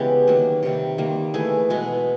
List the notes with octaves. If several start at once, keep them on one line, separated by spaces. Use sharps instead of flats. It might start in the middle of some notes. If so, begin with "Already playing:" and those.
Already playing: C#3 E3 G#3 B3 G4
D#3 F#3 A#3
C3 D#3 G3
D#3 G3 A#3
E3 A3 G#4
B2 G#3 B3